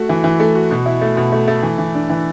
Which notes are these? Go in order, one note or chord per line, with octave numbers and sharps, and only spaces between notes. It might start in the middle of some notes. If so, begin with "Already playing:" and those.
Already playing: A3 F#4
E3
E3
A3
F#4
B2
E4
A3
B2
A3
A3
E3
E3
D4
E3